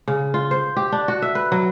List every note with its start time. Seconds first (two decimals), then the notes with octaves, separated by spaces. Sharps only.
0.08 C#3
0.34 F4
0.51 C5
0.77 G4
0.92 D4
1.08 F#4
1.22 E5
1.35 B4
1.52 F#3